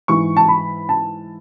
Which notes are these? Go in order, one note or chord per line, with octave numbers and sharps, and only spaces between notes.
G#2 E3 C#6
A5
B5
A5